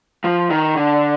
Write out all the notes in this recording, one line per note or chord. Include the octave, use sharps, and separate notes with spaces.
F3
D#3
D3